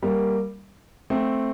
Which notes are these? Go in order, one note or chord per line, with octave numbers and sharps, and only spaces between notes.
G3 A#3
A3 C4